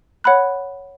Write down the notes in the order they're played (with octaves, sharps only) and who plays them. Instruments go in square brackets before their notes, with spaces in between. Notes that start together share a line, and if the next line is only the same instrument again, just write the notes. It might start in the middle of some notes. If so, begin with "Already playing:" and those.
[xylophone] C#5 F#5 B5 F#6